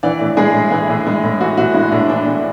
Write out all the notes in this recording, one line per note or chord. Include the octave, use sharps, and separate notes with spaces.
E3 D5
A2
G#3 G#4
A2
E3 E4
A2
G#3
A2
E3 F#4
A2 F#4
G#3 E4
A2 D4
E3 D4
A2